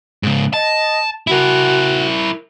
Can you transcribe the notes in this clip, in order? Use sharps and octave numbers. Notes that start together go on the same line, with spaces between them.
G#2 C#3
D#5 A5
E4 F#4 A#4